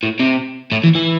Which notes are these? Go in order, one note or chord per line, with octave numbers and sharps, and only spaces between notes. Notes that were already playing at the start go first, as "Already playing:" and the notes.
A2
C3
A2
E3
E3